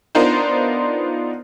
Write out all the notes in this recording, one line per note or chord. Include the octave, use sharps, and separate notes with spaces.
B3 D4 D#4 F4 A#4 C5